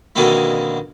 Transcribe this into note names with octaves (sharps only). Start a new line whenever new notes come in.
F2 B2 D3 D#3 A#3 E4